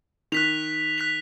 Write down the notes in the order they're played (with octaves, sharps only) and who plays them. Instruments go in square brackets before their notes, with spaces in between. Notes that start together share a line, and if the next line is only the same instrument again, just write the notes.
[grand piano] D#3 [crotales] F#6 B6 F7
[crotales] F#6 B6 F7